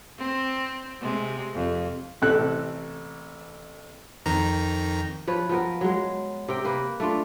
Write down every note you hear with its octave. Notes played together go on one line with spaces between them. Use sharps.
C4
C3 G#3
F2
A1 A2 C3 A4 F#6
F2 D#3 A#5
F3 B4 C#5
F3 B3 A#4
F#3 G#3
C3 A#4 G5
A#3 A#4 B4
A3 D4 F4